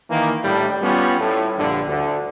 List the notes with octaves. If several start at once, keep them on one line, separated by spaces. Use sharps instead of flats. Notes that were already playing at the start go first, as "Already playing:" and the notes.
D#3 E3 A#3
A2 G3 D4 E4
G3 B3 C#4 F4
A2
A#1 G2 D3
D2 D3